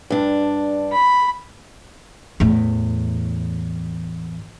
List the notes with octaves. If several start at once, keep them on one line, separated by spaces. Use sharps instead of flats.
G2 D4
B5
E2 A2